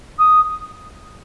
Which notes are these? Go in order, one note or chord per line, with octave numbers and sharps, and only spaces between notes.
D#6